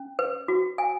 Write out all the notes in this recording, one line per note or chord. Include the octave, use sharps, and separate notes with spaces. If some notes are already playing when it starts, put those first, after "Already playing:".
Already playing: C#4
B4
F#4
G#5